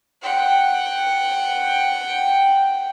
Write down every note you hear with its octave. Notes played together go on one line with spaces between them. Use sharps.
F#5 G5